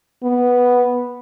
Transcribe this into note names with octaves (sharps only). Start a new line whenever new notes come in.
B3